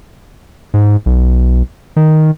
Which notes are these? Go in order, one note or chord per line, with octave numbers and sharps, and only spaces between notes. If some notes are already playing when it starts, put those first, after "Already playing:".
G#2
B1
D#3